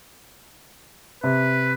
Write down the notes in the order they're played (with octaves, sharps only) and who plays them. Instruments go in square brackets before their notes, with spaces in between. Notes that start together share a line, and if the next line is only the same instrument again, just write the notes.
[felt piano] C3 [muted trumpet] B4